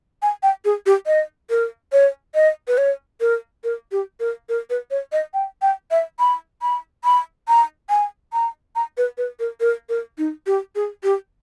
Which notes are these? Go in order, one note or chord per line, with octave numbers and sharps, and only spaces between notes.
G#5
G5
G#4
G4
D#5
A#4
C#5
D#5
B4
C#5
A#4
A#4
G4
A#4
A#4
B4
C#5
D#5
G5
G5
E5
B5
B5
B5
A#5
G#5
A#5
A#5
B4
B4
A#4
A#4
A#4
D#4
G4
G#4
G4